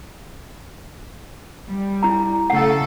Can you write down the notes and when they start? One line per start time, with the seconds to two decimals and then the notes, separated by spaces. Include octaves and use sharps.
1.67 G3
2.03 E4 A#5
2.50 C#3 A3 A4 F#5